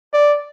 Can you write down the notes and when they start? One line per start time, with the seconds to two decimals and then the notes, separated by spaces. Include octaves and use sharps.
0.13 D5